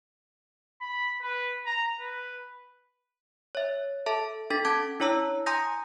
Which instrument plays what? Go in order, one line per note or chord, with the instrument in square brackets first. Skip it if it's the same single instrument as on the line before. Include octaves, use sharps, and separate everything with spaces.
[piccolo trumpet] B5
B4
A#5
B4
[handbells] C#5 E5
A4 E5 A5
D4 A4 A6 B6
C#4 A5 D6 G#6
D4 E4 C#5 A#5 E6
G#5 A#5 C6 D#6 G6 A#6